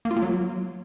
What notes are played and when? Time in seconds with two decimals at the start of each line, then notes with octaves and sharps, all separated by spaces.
0.05 A#3
0.11 F4
0.16 A#3
0.22 F#3